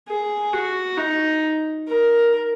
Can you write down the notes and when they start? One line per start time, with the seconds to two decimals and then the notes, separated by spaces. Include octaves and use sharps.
0.09 G#4
0.54 F#4
0.97 D#4
1.87 A#4